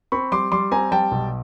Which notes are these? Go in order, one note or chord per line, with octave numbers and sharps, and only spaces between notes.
C4 B5 C#6
G3 C6 D6
G3 C6 D6
C4 G#5 A#5
G3 G5 A5
B1